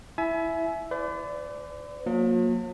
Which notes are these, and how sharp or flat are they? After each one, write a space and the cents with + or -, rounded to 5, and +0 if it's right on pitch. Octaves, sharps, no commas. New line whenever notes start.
E4 +0 E5 +0 G#5 +35
B4 +45 D5 -10
F#3 -45 A#3 +0